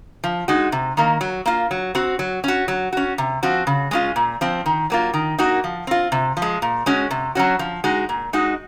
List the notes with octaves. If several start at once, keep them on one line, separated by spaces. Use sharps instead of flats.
F3
G#3 D#4 F#4
C3
D#3 A#3
F#3
A#3 F4
F#3
C4 F#4
F#3
C#4 F#4
F#3
C#4 F#4
C3
F3 C4 F#4
C#3
G#3 C#4 F4
A#2
F3 C4
D#3
F#3 A#3 F4
D#3
A#3 D#4 F#4
F3
C4 F4
C3
F3
G#3
A#2
G#3 C#4 F#4
C3
F#3 C#4 F#4
F3
G#3 D#4 F#4
A#2
G#3 D#4 F#4